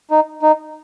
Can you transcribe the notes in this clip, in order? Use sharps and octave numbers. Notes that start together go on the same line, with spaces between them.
D#4
D#4